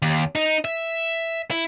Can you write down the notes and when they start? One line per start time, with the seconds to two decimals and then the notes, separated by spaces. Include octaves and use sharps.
0.02 D#2
0.35 D#4
0.65 E5
1.51 E4